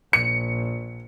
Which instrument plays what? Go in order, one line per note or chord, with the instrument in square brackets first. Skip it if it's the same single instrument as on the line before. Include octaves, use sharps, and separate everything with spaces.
[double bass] A#1 [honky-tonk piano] C#7